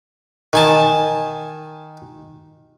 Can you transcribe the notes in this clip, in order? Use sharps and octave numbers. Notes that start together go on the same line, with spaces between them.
D#3 G#5 A5